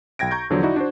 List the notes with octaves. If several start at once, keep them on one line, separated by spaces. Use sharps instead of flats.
B1 G5 G#6 A#6 D7
A#5 C#6 G6 G#6
E2 D3 F3 F#3
D#4 E4 F#4 D5
D4 F#4 C5